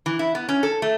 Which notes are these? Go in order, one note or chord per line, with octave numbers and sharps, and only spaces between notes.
E3
E4
B3
C#4
A4
A3